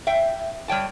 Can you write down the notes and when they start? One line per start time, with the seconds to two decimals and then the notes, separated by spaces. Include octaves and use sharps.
0.07 E5 G5
0.68 G3 C#5 G5 A5